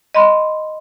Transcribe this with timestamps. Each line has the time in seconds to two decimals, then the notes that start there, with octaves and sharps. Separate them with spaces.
0.14 D#5 B5 C6